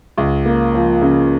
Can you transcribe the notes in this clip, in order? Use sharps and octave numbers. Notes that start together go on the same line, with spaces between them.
C#2
A#3
F3
C#3